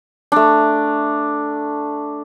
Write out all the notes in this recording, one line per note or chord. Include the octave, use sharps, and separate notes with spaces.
A3 D4